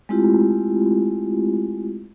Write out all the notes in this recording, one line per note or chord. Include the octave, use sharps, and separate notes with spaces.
G#3 A3 C4 E4 F4 G4